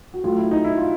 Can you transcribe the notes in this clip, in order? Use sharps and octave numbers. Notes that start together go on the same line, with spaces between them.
F#4
A2 F#3 F4
E4
D#4
E4
F4